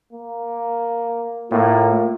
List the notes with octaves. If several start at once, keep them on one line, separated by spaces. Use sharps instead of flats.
A#3
A2 A#3 F4